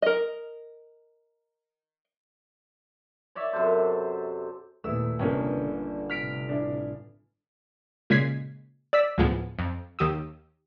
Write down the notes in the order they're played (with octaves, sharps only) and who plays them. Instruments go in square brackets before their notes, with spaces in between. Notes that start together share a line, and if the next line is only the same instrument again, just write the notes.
[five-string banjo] A#4 D#5
[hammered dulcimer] C#5 D5 E5
F#2 C3 A4 C5
[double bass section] D#2 A#2 [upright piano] A3 B3 E4 [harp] E6
[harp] G1 [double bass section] C3 [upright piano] A#3 C#4 G5
[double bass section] D3
[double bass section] A2 C3 [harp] F6 B6 D7
[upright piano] D4 E4
[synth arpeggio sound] A#2 C#3 G#3 G#6 B6 C7
D5 E6 B6
D2 A2 F3 G#3 B3
F2
D#2 D#3 G4 D#6 E6